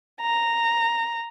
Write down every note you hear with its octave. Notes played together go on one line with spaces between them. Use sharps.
A#5